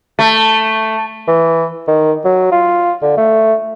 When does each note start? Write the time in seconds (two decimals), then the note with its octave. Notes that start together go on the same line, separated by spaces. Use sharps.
0.19 A3
1.28 E3
1.88 D#3
2.25 F#3
2.52 F4
3.02 D3
3.18 A3